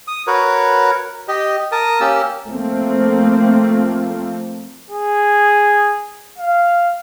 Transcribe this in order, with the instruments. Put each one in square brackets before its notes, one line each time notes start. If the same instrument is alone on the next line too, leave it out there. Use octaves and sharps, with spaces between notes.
[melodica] D#6
F#4 A#4 B4 C#5
G4 D#5
A#4 A5 D#6
A#3 C#4 G4 E6
[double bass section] F3 A3 A#3 C4
[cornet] G#4
F5